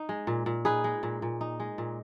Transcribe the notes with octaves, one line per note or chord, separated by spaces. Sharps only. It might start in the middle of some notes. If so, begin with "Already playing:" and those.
Already playing: D#4
G#3
A#2
A#2
D#4 G#4 B4
G#3
A#2
A#2
D#4
G#3
A#2